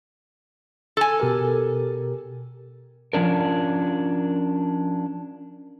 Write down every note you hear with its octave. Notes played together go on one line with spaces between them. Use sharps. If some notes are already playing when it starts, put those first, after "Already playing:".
A4 G#5
B2 G4 A#4
F3 C#4 D4 A#4